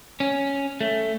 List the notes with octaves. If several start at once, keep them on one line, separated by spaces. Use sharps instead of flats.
C#4
A3